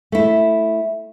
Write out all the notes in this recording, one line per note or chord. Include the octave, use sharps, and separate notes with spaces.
A3 E4